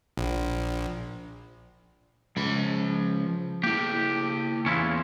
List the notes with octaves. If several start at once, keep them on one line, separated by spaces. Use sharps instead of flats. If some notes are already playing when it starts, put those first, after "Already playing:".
A#1
C#2 F3 B5
A#3 E4 G4
E2 C#4 E4 F4